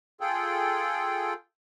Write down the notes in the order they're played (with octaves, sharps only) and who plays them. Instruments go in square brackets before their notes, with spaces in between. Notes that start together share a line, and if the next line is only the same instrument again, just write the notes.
[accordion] F4 G#4 A4 G5